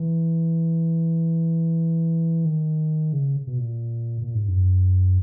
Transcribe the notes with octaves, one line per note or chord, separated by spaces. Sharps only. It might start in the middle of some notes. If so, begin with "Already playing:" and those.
Already playing: E3
D#3
C#3
B2
A#2
A#2
G#2
F#2